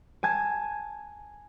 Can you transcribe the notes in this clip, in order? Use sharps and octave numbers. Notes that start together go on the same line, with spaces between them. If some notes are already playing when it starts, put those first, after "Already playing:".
G#5 A5 G#6